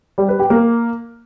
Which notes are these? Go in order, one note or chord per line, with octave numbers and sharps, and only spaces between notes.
G3
B4
G4
A#3